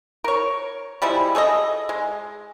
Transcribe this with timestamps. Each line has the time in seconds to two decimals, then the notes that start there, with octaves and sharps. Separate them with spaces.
0.24 A#4 C#5
1.02 F3 G3 G#3 E4
1.35 G#4 A4 C#5 D#5
1.89 G#3